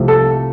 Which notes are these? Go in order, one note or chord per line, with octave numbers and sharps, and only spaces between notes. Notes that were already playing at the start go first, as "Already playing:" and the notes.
Already playing: C2 C3 F3 A3
A4